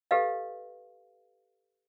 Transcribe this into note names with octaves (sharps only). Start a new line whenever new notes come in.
G4 A4 B4 D#5 F5